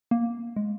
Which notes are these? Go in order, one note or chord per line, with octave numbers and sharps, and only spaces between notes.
A#3
G#3